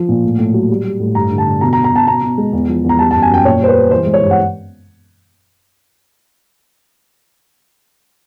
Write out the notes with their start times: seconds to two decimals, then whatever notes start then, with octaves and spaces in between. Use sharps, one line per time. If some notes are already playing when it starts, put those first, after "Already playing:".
Already playing: F3
0.09 A#2
0.23 A2
0.39 A2
0.54 F#3
0.69 G3
0.84 G3
1.00 A2
1.15 G2 A#5
1.31 D3
1.38 A5
1.46 D3
1.61 B2 A#5
1.73 A#5
1.77 B2
1.84 A#5
1.92 B2 A5
2.07 B2 A#5
2.22 B2
2.38 G#3
2.53 E2
2.69 F3
2.84 E2
2.89 A#5
2.99 G3 A5
3.11 A5
3.15 F#2
3.22 G#5
3.30 F#2 G5
3.45 A#2 C#5
3.61 G3 C5
3.68 B4
3.76 G3
3.91 E3 C5
4.06 G#3
4.14 C#5
4.21 G2
4.31 F#5